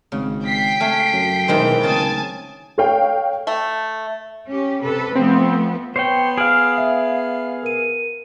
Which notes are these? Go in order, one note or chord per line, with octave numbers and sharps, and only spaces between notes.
G#1 C#3
G5 B6 C7
A3 F5 G#5
F#2
B2 D#3 E3 G#3 C5
D1 C#3 G#4 G#5 A5 A6
A4 C#5 F5 G5
A3
C#4 G4
C3 A4 B4
F3 A3 B3 C4
B3 C5 C#5 G5
G#4 F5 F6 D7 F#7
E5
A#4 D#7